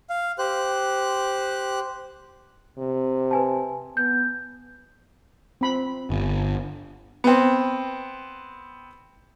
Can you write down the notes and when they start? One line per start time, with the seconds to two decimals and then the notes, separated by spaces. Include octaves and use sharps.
0.10 F5
0.39 G4 C5 F#6
2.78 C3
3.31 B4 G#5 A5
3.97 B3 G6
5.61 C4 B5
6.10 G1
7.24 B3 C4